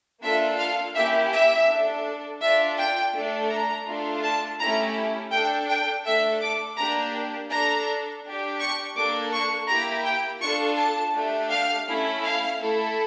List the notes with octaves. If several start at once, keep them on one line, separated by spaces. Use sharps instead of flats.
A#3 D4 F4 A4 E5
F5
A#3 C#4 E4 G4 E5
E5
D4 A4
D4 F4 A4 E5
G5
A3 D4 A4
A#5
A3 D4 F4 A4
A5
A3 C#4 E4 G4 A#5
D4 A4 G5
G5
A3 D4 A4 E5
D6
A#3 D4 G4 A#5
D4 A4 A#5
D4 G4
C#6
A#3 D4 A4 D6
C#6
A#3 E4 G4 A#5
G5
D4 F4 A4 C#6
A5
A3 D4 G4
F5
A3 C#4 E4 A4
F5
A3 E4 A4